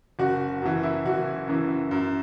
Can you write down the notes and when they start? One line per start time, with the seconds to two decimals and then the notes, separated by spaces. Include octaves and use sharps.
0.19 F#1 F#4
0.62 F#2 E3 F#4
0.83 E4
1.05 F#1 F#4
1.48 F#2 E3
1.91 F#2